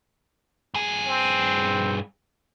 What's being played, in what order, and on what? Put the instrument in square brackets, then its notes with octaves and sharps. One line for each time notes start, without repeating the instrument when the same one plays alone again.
[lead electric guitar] G2 G#4
[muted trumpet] C4